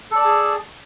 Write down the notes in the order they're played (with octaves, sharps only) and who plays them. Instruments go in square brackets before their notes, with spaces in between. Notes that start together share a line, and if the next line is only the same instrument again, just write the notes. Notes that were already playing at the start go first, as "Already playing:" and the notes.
[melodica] A4
D5
A5
G#4